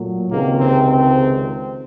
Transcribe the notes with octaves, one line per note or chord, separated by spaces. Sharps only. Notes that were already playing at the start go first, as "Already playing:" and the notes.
Already playing: A#2 F#3 A3
C#2 C3 D#3 G#3 A#3
C4
C4